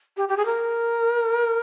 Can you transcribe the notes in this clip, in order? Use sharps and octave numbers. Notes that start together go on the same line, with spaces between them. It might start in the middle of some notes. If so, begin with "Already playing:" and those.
G4
G4
G#4
A#4